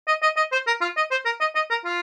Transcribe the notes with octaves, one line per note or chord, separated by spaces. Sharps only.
D#5
D#5
D#5
C5
A#4
F4
D#5
C5
A#4
D#5
D#5
A#4
F4